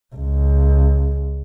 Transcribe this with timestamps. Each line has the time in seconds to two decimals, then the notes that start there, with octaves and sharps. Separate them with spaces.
0.15 C#2